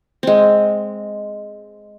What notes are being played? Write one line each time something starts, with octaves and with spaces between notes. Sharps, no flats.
G#3 C4